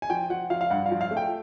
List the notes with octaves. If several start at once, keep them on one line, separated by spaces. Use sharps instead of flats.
G#5
F3 G5
F3 F#5
F3 F5
F5
G2 F#5
F5
F3
F5
A3
G5